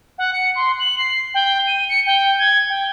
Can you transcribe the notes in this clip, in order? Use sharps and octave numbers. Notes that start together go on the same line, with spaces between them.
F#5
C#7
C6
F#7
C7
G5
D#7
C#7
G5
G#6
G5